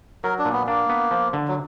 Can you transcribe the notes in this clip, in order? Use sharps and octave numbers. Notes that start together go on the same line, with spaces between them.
F#3 A#4
D4
A#2
B3
A#3 D4
B3
F3
D3
F#3